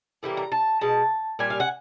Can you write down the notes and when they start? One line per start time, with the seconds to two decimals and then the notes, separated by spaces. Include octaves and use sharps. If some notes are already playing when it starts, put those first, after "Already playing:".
0.23 A2 E3 G3 A#3
0.37 A#5
0.52 A5
0.81 B2 G#3 A5
1.39 A#2 G3 G#5
1.50 F5
1.60 F#5